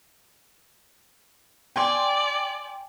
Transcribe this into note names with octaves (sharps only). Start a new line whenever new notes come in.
D5 G5 G#5 C6